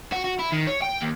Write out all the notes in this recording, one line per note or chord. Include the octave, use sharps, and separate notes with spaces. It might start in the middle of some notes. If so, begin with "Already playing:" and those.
F#4
F#4
E4
D#3
C#5
G5
D#2